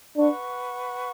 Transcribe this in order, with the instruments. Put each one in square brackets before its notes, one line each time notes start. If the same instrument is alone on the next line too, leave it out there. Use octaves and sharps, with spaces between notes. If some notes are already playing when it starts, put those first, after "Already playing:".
[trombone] D4 [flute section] B4 F#5 C#6